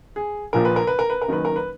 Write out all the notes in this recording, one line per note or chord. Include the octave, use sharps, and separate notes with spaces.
G#4
A#1 A#2 F3 A#4
B4
A#4
B4
A#4
B4
A#4
F#1 F#2 D#3 B4
A#4
B4